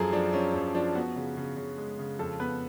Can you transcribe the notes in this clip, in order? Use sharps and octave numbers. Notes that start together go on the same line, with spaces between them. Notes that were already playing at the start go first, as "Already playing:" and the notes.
Already playing: F#2 F3 G#4 A4
F3 D4
F3 C#4
F#2 C#4
F3 D4
B3 F#4
C#3
C#3
C#3
G#3
C#3
F2 A4
B3 B4